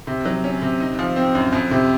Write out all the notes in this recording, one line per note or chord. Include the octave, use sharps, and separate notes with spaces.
C3
F#3
C#4
C3
D#4
F3
C4
F#2
F2
C3